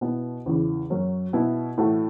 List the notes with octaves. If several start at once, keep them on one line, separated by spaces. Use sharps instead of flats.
B2 B3 E4
E2 C#3 E3
F#2 F#3 C#4
B2 B3 E4
A2 E3 A3 F#4